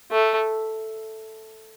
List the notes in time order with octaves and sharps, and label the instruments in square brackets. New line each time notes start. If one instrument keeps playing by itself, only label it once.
[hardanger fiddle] A3